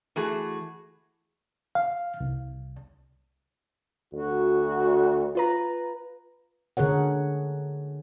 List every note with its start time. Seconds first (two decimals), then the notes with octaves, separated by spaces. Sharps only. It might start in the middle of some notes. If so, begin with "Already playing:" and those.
0.16 E3 A3 F#4 G#4
1.75 F5
2.21 C2
4.14 D2 F#4
5.35 F4 B4 A#5
6.77 D3 G#4 A#4 C#5 F#5